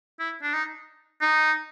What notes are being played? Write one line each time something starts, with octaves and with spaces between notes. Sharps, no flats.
E4
D4
D#4
D#4